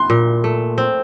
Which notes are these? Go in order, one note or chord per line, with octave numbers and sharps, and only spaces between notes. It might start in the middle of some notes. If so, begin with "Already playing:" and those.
Already playing: C6 F#6
A#2
A3
C4